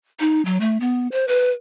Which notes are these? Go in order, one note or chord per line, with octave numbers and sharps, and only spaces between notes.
D#4
F#3
A3
B3
C5
B4